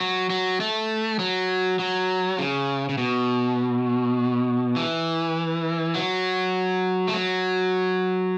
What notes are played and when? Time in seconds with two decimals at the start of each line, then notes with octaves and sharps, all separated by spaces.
0.01 F#3
0.30 F#3
0.60 A3
1.19 F#3
1.79 F#3
2.38 C#3
2.89 C#3
2.98 B2
4.76 E3
5.95 F#3
7.08 A3
7.14 F#3